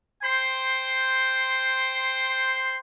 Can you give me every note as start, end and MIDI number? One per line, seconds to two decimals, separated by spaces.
0.23 2.77 72
0.23 2.77 79
0.23 2.77 84